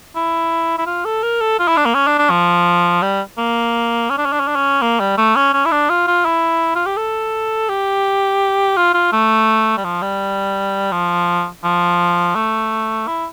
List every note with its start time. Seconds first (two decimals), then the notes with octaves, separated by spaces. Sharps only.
0.16 E4
0.78 E4
0.86 F4
1.05 A4
1.23 A#4
1.41 A4
1.59 F4
1.68 E4
1.77 D4
1.86 A#3
1.94 C#4
2.07 D4
2.19 D4
2.31 F3
3.02 G3
3.38 A#3
4.10 C#4
4.18 D4
4.26 C#4
4.33 D4
4.40 C#4
4.48 D4
4.56 C#4
4.82 A#3
5.00 G3
5.18 A3
5.36 C#4
5.54 C#4
5.66 E4
5.71 D4
5.90 F4
6.07 F4
6.26 E4
6.76 F4
6.86 G4
6.97 A4
7.69 G4
8.77 F4
8.94 F4
9.13 A3
9.78 G3
9.84 F3
10.02 G3
10.92 F3
11.64 F3
12.35 A3
13.08 E4